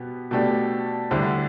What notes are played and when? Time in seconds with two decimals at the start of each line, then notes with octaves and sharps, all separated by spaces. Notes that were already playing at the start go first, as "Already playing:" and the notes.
Already playing: B2 B3 G4
0.31 B2 A3 D4 G4
1.11 D2 D3 G3 E4 G4